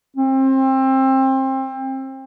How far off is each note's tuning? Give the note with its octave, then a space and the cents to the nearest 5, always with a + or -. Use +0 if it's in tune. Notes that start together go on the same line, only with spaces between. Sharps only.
C4 +25